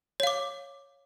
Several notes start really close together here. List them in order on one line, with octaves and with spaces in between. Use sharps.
C#5 F5 D6